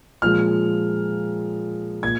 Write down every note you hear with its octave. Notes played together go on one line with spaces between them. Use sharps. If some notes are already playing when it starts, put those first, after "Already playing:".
A#2 F3 G#3 F6
A#2 G#6